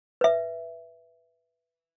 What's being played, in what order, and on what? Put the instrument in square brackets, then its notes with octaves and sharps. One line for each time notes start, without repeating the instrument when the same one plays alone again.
[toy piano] B4 E5